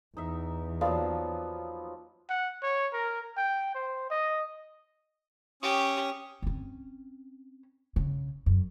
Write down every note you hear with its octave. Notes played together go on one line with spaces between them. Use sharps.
E2 D#4 E5
F3 F#3 A#3 B3 D5 F5
F#5
C#5
A#4
G5
C5
D#5
C#4 G4 C#6 D#6
C4 C#4
C#3
F#2